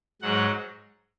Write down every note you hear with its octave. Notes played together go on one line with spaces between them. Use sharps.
G#2 F#3 F#5